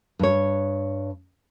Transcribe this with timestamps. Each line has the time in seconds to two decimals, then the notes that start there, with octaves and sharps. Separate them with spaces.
0.19 G2 C#5